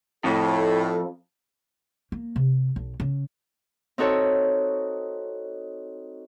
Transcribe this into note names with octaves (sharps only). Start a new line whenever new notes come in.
F2 A2 A4
A#3
C3
B1
C#3
C4 D#4 F#4 A4 C#5